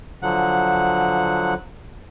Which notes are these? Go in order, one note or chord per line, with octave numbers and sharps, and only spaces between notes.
D3 F3 F#3 F#5